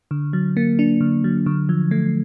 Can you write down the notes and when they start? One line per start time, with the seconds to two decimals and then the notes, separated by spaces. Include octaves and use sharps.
0.11 D3
0.33 F#3
0.57 A#3
0.79 D4
1.01 D3
1.24 F#3
1.46 D3
1.69 F3
1.91 A3